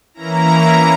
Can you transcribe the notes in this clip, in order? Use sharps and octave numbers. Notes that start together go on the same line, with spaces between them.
E3 A#3 C#4 E4 A#5